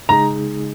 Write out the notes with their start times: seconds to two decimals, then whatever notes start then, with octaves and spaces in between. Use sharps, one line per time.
0.09 C#3 G#3 D#4 G#4 A#5